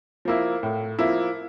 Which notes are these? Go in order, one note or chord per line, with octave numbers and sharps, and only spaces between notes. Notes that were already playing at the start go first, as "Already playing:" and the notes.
F3 A#3 E4
A2
F3 A#3 E4